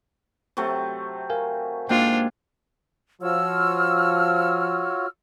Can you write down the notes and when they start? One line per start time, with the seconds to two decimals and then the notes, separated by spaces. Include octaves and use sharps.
0.57 C3 F#3 A3
1.30 A#4 F5 G#5
1.89 G#2 A#3 D4 F4 G5
3.22 F3 F4 F#4 C#5 E6 F6